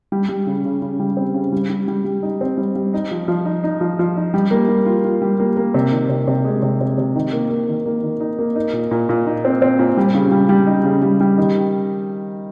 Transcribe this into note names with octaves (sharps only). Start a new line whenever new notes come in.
G3
G3
C#3
C#3
C#3
G3
C4
C#3
G3
G3
G3
G3
D#4
C4
G3
G3
D#4
F3
F3
D#4
D#4
F3
F3
D#4
G3
A#3
G3
F4
F4
G3
A#3
A#3
C3
D#3
C3
C3
G#3
C3
C3
C3
D#3
A#3
A#3
D#3
A#3
D#3
D#4
A#3
D#4
A#2
A#2
A#2
D#4
C4
C4
A#2
G3
C#3
G3
G3
D#4
C#3
G3
G3
D#3